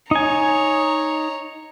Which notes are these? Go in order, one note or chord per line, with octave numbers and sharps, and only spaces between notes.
D#4 C#5 G#5 A#5